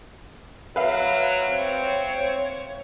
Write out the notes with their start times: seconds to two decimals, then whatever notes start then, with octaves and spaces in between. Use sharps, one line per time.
0.76 F#3 B4 E5 F5
1.49 C4 C#5